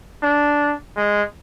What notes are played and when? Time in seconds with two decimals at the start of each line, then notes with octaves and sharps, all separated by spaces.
0.23 D4
0.96 G#3